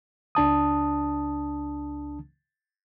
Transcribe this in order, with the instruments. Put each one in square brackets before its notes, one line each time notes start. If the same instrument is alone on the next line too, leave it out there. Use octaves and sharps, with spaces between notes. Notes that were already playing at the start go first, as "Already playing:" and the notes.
[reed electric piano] C#2 D4 A5 D#6